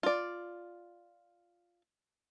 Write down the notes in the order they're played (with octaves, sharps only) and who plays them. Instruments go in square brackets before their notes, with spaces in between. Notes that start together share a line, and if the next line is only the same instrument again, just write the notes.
[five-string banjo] F4 D5